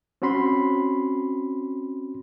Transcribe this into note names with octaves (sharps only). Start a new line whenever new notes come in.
C4 C#4 F#4 B5 C6